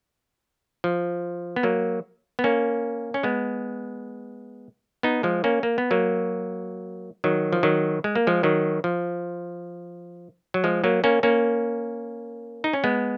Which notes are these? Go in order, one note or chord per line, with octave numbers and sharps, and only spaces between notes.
F3
B3
F#3 A#3
B3
A#3 C#4
C#4
G#3 B3
B3 D#4
F3 G#3
A#3 C#4
A#3
B3
F#3 A#3
D#3 F#3
F3
D#3 F#3
G#3
A#3
F3 G#3
D#3 F#3
F3
F#3
F3 G#3
F#3 A#3
A#3 C#4
A#3 C#4
D#4
C#4
G#3 B3